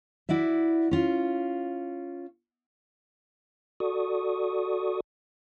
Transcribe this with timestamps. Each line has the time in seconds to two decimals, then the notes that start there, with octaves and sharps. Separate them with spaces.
0.29 E4 F#4 D5 E5
0.91 C#4 F4
3.80 F#4 A4 D5 C#6 D#6